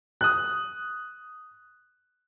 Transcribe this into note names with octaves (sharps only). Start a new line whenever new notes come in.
D#6 F#6